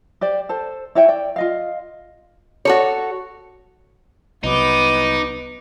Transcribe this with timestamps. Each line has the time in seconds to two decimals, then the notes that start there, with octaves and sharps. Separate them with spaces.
0.21 G4 C5 D5
0.49 A4 C5
0.95 E4 C#5 E5 G5
1.08 D5 G5
1.36 F4 D#5 F5
2.65 F#4 A4 C#5
4.44 C2 F#3 B3 D#4 D6